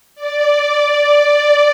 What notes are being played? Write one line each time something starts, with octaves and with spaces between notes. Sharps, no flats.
D5
D5